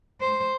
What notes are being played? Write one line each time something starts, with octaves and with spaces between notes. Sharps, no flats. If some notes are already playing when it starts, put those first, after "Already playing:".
C5